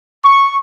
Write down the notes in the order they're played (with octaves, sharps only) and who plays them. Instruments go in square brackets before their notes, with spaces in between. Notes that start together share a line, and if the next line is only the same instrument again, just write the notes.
[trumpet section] C#6